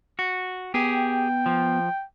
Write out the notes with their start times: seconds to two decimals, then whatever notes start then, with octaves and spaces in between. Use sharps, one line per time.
0.19 F#4
0.74 B3 G4 G#4 G5
1.46 F3